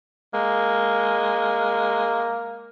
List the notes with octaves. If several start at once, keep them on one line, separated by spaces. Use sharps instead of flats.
G#3 A#3